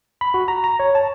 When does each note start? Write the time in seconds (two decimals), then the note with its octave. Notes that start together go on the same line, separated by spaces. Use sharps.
0.21 B5
0.34 F#4
0.48 A#5
0.64 A#5
0.80 C#5
0.95 A5